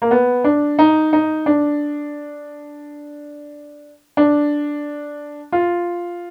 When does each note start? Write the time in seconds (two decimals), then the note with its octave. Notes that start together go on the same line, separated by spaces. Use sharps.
0.02 A#3
0.11 B3
0.44 D4
0.79 D#4
1.13 D#4
1.46 D4
4.17 D4
5.52 F4